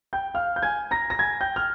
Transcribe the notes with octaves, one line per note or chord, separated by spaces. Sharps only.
G5 G6
F5 F6
G6
G#5 G#6
A#5 A#6
A#6
G#5 G#6
G5 G6
F6